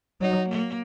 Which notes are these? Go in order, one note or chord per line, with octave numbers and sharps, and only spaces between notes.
F#3 D#4
A#3